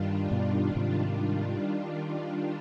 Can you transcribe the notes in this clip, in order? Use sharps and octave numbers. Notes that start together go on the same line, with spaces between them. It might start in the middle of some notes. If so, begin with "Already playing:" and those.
Already playing: G2 D#3 G3 D4 F4
G2 B2
G#2 C3